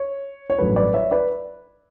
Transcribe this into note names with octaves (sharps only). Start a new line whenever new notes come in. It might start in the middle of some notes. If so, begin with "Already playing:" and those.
Already playing: C#5
C#5
A1 G2 F#3 A3 B4
B4 D5
C#5 E5
B4 D5